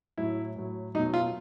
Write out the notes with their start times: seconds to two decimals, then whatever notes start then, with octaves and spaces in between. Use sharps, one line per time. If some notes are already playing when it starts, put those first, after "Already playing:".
0.18 A2 F#3 E4
0.56 A2 F#3
0.95 F#3 D#4
0.99 B2
1.14 F4